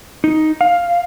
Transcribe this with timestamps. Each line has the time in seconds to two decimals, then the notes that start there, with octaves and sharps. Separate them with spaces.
0.24 D#4
0.61 F5